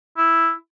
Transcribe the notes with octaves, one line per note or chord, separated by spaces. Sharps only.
E4